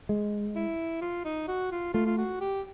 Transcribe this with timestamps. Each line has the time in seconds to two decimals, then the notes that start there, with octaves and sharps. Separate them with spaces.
0.09 G#3
0.55 E4
1.01 F4
1.25 D#4
1.48 F#4
1.71 F4
1.94 A3 F4
2.06 F4
2.18 F#4
2.41 G4